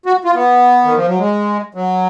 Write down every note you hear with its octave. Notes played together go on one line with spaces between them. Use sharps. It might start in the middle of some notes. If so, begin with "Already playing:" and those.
F#4
F4
B3
D#3
F3
F#3
G#3
F#3